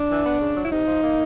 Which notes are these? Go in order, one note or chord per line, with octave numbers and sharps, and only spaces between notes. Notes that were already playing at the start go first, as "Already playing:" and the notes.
Already playing: D4
E3
B3
C#3
F#3
E4
C3 D#4
F3
A#3